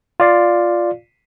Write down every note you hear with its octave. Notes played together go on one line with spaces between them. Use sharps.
F4 D5 F5